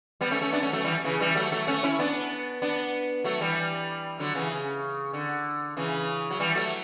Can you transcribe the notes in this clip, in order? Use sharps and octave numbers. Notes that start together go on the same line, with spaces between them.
G3 B3
A3 C#4
A3 C#4
B3 D4
A3 C#4
F#3 A3
E3 G3
C#3 E3
E3 G3
F#3 A3
F#3 A3
A3 C#4
C#4 E4
B3 D4
B3 D4
F#3 A3
E3 G3
D3 F#3
C#3 E3
C#3
D3
C#3 E3
F#3
E3 G3
F#3 A3